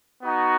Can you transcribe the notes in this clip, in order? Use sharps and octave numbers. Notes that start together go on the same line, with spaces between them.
B3 D#4 F#4